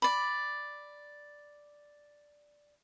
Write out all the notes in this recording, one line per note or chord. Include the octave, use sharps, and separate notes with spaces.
D5 B5